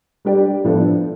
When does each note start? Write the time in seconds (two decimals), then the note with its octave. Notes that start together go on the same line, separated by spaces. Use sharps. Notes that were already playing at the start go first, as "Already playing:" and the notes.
0.25 G3 D4 G4 D5
0.64 A2 F3 B3 D4 A4